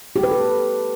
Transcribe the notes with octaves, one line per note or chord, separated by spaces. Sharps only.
G4
B4
A4